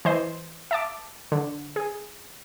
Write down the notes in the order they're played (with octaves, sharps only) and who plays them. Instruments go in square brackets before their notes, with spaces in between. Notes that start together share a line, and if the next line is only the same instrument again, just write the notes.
[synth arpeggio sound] E3 C5 D#5
E5 A5 D6
D3
G#4